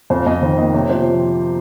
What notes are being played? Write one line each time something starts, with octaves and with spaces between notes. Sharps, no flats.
F2 C5
F2 D#5
D#3 C5
A#3 D#5
C3 C#5
F3 C5